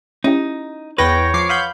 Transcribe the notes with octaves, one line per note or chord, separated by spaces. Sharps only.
C#4 D#4 E4 G4
E2 B4 C#5 G5 A#6
F3 D6 C7
F5 F#5 B5 C6 D#6 G6